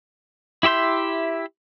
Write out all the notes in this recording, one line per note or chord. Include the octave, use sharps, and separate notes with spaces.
E4 G4 E5 C6 G6